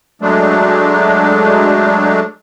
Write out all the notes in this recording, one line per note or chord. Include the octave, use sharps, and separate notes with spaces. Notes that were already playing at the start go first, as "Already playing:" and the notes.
F#3 G#3 A3 D4